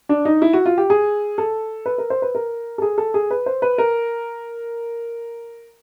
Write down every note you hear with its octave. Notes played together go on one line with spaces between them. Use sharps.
D4
D#4
E4
F#4
F4
G4
G#4
A4
B4
A#4
C5
B4
A#4
A4
G#4
A4
G#4
B4
C5
B4
A#4